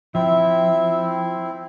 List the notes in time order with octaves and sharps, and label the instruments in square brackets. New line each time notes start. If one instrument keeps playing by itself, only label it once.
[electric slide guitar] F3 [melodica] C4 E4 [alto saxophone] E5